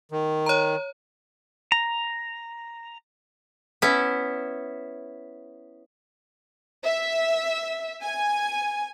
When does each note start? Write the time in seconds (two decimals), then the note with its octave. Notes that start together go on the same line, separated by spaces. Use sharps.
0.11 D#3
0.46 C#5 A#5
1.72 A#5
3.82 B3 C#4 E4
6.85 E5
8.03 G#5